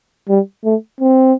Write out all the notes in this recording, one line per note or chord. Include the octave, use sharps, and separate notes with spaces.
G3
A3
C4